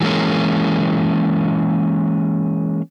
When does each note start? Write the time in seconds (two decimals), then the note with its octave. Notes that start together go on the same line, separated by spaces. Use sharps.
0.01 E3 F#3 G#3 A#3 C#4